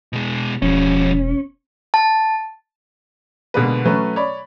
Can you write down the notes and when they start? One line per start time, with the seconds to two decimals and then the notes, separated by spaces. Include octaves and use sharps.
0.13 B2 G#3
0.62 E1 F3 G3 C#4
1.94 A5
3.54 B2 D3 G#3 A#3 B3 B4
3.85 F#3 A3 C#4 B4
4.16 C#5 D5 B5